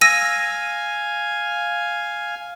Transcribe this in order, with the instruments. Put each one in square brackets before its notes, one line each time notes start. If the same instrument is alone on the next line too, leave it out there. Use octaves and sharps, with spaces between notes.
[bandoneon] F5 G#5 [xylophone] E6 A#6 D#7